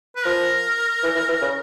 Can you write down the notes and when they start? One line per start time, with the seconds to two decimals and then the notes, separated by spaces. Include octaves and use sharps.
0.16 B4
0.25 F3 A#4
1.03 E3
1.16 E3
1.29 E3
1.42 C#3